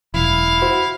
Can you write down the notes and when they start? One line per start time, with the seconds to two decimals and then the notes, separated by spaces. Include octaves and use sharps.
0.14 E1 F#2 E4 F5
0.62 F#4 C5